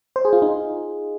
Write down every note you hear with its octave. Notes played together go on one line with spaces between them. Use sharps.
C5
G#4
F4
D#4